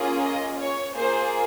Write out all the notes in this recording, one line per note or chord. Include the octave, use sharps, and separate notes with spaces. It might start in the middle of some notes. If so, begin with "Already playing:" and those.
Already playing: A#3 C#4 F4 G#4
D#5
C#5
A#3 F4 G#4 C5